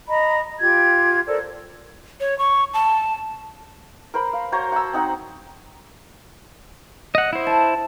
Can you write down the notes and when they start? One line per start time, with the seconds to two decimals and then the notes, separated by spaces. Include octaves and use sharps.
0.08 D#5 A#5 B5
0.60 F4 G4 G#6
1.26 A4 A#4 C5 D5
2.20 C#5
2.39 C#6
2.74 A5
4.14 A#4 C5 B5
4.33 F5
4.52 F#4 C5 C#5 A#5
4.72 F#5 A5 A#5 E6
4.93 C4 D#4 F#5
7.15 D#5 F#5
7.33 E4 C5
7.47 A5